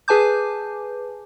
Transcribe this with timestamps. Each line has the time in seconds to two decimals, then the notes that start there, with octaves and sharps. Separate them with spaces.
0.08 G#4 B4 G#5 A5 D6 G6